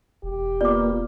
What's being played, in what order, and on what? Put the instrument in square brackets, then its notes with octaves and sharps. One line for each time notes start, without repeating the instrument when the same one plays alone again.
[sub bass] E1 [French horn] G4
[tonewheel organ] A#3 B3 F4 [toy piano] D5 D6